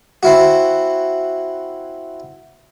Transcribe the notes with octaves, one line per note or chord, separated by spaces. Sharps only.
C4 E4 F#4